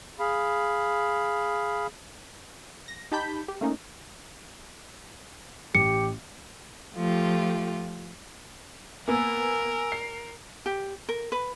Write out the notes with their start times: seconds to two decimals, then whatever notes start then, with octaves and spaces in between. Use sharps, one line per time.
0.20 G#4 F5 B5
2.88 A#6
3.12 D#4 G4 A5 B5 G6 B6
3.48 G4
3.61 A3 A#3 C#4 D#4
5.75 A1 G4 C#7
6.95 F3 A3 F4 G4
9.08 A#3 B3 A#4 G#5 E6
9.92 C7
10.66 G4
11.09 A#4
11.32 B4